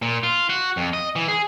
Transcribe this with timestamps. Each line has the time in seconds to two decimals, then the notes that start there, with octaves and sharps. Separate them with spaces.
0.02 A#2
0.23 F4
0.50 F#4
0.77 F2
0.93 D#5
1.16 E3
1.28 G#4